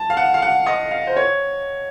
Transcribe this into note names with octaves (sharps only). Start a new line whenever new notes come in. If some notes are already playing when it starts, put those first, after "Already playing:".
Already playing: A5
F5
F#5
F5
F#5
D#5
F5
C5
C#5